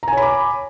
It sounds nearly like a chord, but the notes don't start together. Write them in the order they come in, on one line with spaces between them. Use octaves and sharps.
A#5 G#5 C#5 B5 D6